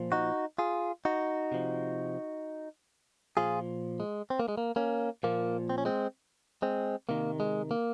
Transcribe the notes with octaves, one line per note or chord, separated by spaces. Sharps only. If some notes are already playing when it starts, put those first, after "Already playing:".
Already playing: A#2 F3
D#4 F#4
F4 G#4
D#4 F#4
C3 F3
A#2 F3 F4 G#4
G#3
C4
A#3
G#3
A#3
A#3 C#4
A#2 F3 A#3
C4
C#4
G#3 C4
G#3 C4
C3 D#3 A#3
G#3
A#3